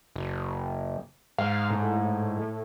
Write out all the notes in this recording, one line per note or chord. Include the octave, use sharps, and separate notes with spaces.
F#1
G#2 F5
A2